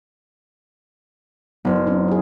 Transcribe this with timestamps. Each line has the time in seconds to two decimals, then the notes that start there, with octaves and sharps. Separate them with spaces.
1.65 F#1 B3 C5
1.87 C4 C#4 D#4
2.08 E4 G#4